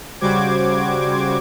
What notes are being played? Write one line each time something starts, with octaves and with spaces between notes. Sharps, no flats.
C#3 G3 F#4 C5 D6 G#6